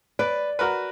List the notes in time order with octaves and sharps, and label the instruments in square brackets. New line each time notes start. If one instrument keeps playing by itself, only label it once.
[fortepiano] B4 [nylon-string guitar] D5
[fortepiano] F#4 A#4 B4